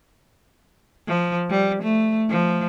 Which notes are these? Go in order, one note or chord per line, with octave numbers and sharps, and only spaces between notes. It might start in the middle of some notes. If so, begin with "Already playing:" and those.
F3
G3
A3
F3